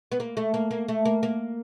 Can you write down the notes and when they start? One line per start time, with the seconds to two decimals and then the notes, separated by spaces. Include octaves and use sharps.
0.12 B3
0.20 A#3
0.37 A3
0.54 A#3
0.71 A#3
0.88 A3
1.05 A#3
1.23 A#3